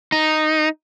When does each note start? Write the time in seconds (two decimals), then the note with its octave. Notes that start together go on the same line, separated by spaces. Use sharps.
0.12 D#4